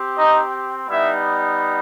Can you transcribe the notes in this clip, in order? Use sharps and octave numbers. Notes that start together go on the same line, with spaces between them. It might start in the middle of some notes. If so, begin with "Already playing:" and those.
Already playing: C4 G4
D#4 D#5
G3 B3 D#4 E4 E5